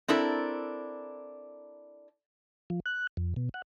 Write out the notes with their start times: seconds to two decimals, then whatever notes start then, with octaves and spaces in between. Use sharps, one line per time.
0.08 C4 D4 E4 A4 A#4
2.70 F3
2.86 F#6
3.17 F2
3.36 B2
3.54 F#5